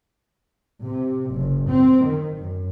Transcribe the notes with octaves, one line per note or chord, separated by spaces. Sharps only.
C3
F#1
C4
D#3
F#2